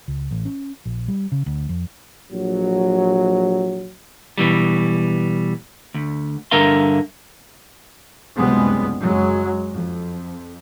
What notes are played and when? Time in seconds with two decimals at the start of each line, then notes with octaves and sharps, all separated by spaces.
0.08 C#2
0.31 A1
0.45 C#4
0.86 A#1
1.08 G3
1.32 C#3
1.46 D2
1.69 F2
2.32 A#1 F#3
4.38 B2 E3 G3
5.94 D2
6.51 G2 D3 A#4 E5 F5 C6
8.37 F#1 C#2 C3 G3 G#3 B3
9.03 F#2 F#3 G#3
9.72 F2